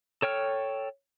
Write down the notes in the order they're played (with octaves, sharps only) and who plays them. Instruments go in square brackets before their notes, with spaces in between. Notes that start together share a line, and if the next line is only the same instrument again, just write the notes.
[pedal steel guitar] A4 C#5 G5 F6